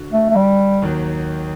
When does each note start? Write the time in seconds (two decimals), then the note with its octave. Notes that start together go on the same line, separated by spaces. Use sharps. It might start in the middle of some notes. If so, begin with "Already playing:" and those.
Already playing: D3 F#4
0.12 A3
0.30 A3
0.36 G3
0.82 D#2 D#3 F#3